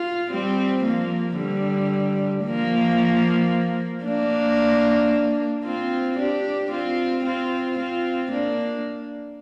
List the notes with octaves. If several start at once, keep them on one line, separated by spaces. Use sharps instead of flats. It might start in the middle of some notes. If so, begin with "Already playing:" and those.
Already playing: F4
G3 C4
F3 A#3
D3 G3
F3 A#3
A#3 D4
C4 F4
D4 G4
C4 F4
C4 F4
C4 F4
A#3 D4